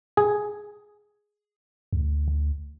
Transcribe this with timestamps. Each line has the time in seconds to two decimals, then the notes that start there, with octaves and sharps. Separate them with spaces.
0.17 G#4
1.93 D2